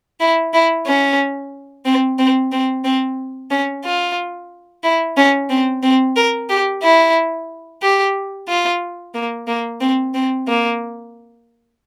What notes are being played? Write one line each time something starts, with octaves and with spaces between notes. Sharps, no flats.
E4
E4
C#4
C4
C4
C4
C4
C#4
F4
E4
C#4
C4
C4
A#4
G4
E4
G4
F4
A#3
A#3
C4
C4
A#3